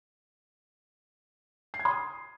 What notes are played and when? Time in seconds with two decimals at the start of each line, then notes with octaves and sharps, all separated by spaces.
1.74 C7
1.79 G#6
1.85 C6
1.91 D#6